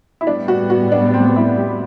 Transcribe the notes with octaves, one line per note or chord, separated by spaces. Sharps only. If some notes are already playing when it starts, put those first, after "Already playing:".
E4
A2 G3 B3 D4
F#4
F#4
D4
C4
E4
G4